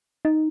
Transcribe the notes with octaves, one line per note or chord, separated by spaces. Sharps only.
D#4